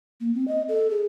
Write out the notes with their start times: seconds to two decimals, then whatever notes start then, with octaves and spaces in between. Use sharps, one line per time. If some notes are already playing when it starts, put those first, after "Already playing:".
0.20 A#3
0.34 C4
0.48 D#5
0.68 A4
0.90 G#4